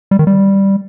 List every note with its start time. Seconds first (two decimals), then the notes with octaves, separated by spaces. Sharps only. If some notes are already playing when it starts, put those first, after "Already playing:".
0.11 G3
0.19 D#3
0.27 G3